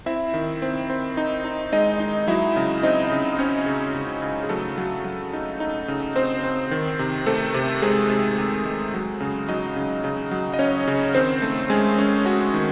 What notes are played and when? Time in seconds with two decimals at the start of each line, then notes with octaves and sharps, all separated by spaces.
0.06 C4 E4 E5
0.34 D#3
0.62 C4
0.90 C4
1.17 D#4
1.45 D#4
1.72 G#3 D#4 D#5
2.00 D#4
2.27 F#3 E4 E5
2.56 C#3
2.83 C4 D#4 D#5
3.11 C#3
3.33 D#5
3.39 C4 C#4 C#5
3.66 C#3
3.95 C#3
4.22 C#3
4.44 G#4
4.49 F#3 A3 A4
4.78 F#3
5.05 F#3
5.33 D#4
5.60 D#4
5.88 C#3
6.16 C4 C5
6.44 C4
6.71 D#3
6.99 C3
7.26 A3 C4 A4
7.54 C3
7.82 C3 G#3 G#4
8.10 C3
8.38 C3
8.65 G#3
8.94 F#3
9.20 C#3
9.48 F#3 D#4 D#5
9.76 C#3
10.04 C#3
10.31 F#3
10.54 D#5
10.59 C#4 C#5
10.88 C#3
11.14 D#3 C4 C5
11.42 A3
11.70 G#3 C#4 G#4
11.98 C#4
12.25 C#4 F#4
12.54 D#3